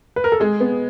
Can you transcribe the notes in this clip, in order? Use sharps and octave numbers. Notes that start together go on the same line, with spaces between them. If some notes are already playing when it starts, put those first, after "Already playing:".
B4
A#4
A4
G#3 G#4
B3